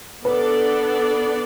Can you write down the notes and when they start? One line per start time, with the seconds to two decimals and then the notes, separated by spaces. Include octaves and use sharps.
0.25 B3 D4 A4 B4 D5